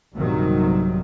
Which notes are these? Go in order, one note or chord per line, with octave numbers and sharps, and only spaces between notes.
A#1 G2 C3 D#3 F#3